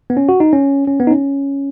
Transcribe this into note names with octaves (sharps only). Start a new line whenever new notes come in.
B3
C#4
F#4
D#4
C#4
C#4
B3
D#4
C#4